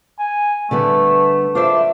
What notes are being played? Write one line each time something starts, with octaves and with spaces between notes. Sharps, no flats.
G#5
D3 G3 A3 B3
D4 F4 C5 E5